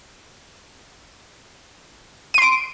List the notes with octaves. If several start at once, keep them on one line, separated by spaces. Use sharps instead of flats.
C6 D7 D#7